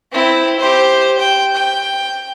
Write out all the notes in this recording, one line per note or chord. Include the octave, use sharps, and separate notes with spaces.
C4 E4
G4 C5
G5
G5